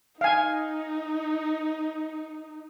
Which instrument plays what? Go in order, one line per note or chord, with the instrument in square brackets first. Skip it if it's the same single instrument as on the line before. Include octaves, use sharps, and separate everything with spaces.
[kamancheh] D#4 [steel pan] F5 G#5